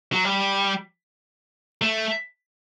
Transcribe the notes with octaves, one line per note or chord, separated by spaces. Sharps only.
F#3
G3
A3